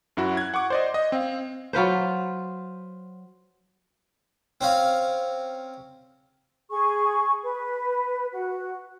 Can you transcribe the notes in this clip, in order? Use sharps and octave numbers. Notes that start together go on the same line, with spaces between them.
F#2 E4 F#4
F#6 G#6
F#5 C#6 D6
C5 D5 D#5
D#5
C4 F5
F#3 F4 B4 C5
C4 C#4 F5
G#4 C#6
B4
F#4